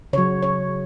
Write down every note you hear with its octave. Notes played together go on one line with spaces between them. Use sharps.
C#3 F#3 C#5
C#5